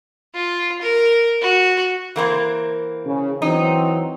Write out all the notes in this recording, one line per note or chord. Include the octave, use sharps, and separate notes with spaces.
F4
A#4
F#4
E3 A#3 C4
C#3
E3 F#3 C4 D#4